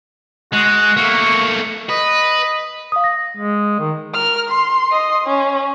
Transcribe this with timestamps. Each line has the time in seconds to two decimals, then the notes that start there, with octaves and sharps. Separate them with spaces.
0.53 G#3 F#4
0.97 A3 A#3 C#6
1.89 B4 D#5
2.92 F5 D#6
3.04 A#6
3.37 G#3
3.79 D#3
4.14 A#4 F6
4.50 C6
4.91 D#5 C6
5.27 C#4